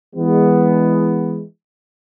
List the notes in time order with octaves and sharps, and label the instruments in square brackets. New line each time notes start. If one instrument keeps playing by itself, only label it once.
[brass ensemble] E3 G#3 B3